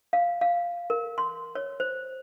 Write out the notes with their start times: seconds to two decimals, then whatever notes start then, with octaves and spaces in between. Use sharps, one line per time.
0.13 F5
0.41 F5
0.90 A#4
1.18 C6
1.55 C#5
1.80 C5